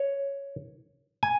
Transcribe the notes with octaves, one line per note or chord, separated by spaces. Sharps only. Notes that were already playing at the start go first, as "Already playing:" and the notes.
Already playing: C#5
G#5